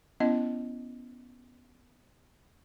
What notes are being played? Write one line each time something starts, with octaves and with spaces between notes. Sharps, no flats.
B3 C#4 E4 D#5